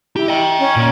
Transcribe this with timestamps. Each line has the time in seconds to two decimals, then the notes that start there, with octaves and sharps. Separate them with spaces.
0.16 E4 G4
0.28 D#5 G5
0.59 C#4
0.76 A#2